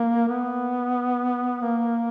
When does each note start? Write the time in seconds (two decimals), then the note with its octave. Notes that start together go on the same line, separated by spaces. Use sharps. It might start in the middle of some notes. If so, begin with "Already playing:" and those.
Already playing: A#3
0.29 B3
1.61 A#3